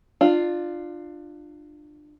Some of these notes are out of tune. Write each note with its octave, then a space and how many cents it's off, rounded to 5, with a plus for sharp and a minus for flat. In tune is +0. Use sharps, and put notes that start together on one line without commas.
D4 +30 F4 +0